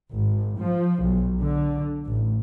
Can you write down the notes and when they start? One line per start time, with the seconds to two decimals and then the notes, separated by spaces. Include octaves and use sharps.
0.13 G#1
0.60 F3
1.04 B1
1.40 D3
2.06 A1